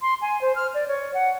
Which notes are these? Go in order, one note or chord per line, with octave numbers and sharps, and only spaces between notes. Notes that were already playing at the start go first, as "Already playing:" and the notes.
C6
G#5
C5
F6
D5
C#5
F#5